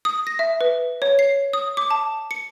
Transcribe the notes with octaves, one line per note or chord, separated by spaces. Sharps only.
D#6
A#6
E5
B4
C#5
C7
D#6
D6
A5
C#7